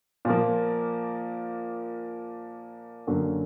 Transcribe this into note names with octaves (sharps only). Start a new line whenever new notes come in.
A#2 F3 A#3
F#2 D3 F#3 A#3 C#4